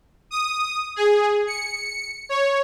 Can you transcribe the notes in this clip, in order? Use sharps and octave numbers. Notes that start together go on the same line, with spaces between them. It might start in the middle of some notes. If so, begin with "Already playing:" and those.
D#6
G#4
C#7
C#5